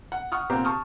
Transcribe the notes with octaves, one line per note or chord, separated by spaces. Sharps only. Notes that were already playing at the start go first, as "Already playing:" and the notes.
F#5
F#5 C#6 D#6 F6
A#2 C4 G4 F#5 A#5
A5 C#6 D#6 F6